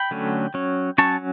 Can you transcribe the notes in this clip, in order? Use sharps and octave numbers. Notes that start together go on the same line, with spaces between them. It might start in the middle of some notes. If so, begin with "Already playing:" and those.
Already playing: G5 B5
D3 F#3 A3 C#4
F#3 C#4
F#3 C#4 A5 C#6